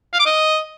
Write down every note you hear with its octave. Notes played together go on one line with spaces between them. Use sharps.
F5
D6
D#5